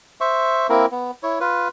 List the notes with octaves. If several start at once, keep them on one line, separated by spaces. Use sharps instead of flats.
C5 E5 C#6
A#3 C4 E4 A#4
B3
E4 C#5
F4 B4